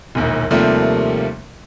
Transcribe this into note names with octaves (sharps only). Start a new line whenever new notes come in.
E1 A#1 D#2
D#2 C3 F3 G3 A3 A#3